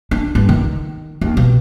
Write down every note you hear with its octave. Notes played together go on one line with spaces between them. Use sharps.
D4
G2
D#3
D#2
B2